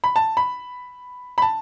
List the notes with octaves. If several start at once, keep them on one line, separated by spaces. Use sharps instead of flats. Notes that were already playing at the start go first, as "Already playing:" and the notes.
B5
A5
B5
B5
A5